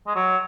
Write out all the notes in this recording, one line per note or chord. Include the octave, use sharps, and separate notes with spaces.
G#3
F#3